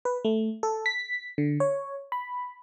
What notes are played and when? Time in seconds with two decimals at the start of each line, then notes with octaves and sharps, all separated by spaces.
0.05 B4
0.25 A3
0.63 A4
0.86 B6
1.38 D3
1.60 C#5
2.12 B5